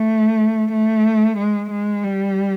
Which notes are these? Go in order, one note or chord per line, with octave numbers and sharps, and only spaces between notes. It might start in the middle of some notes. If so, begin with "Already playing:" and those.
Already playing: A3
A3
G#3
G#3
G3